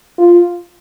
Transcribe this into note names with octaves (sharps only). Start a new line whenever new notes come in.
F4